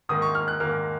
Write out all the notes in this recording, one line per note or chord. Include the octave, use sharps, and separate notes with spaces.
G#2 D#3 A#3 D#6
C#6
F6
F#6
G#2 D#3 A#3 F6